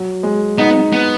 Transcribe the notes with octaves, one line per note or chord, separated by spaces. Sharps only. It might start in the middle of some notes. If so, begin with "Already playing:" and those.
Already playing: F#3
G#3
B3 D#4
B3